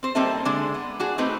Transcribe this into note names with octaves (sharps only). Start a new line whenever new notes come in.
C4 C5
G3 A#3 C4 D#4 A4 E5
D3 G#3 D4
B3
D4 F#4 G#4
A3 C4 D#4 B4